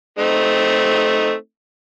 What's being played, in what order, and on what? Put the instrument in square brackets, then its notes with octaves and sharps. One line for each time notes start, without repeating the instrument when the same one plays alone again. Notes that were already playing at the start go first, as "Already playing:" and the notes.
[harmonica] A3 C4 D#4